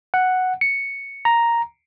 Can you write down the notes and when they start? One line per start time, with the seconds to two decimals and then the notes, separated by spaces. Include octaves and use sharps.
0.14 F#5
0.61 C#7
1.25 A#5